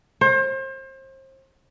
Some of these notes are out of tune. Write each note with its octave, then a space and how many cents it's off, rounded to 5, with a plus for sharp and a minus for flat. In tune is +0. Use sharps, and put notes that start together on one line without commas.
C5 +35